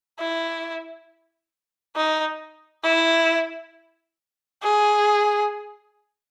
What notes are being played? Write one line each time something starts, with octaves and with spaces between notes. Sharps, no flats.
E4
D#4
E4
G#4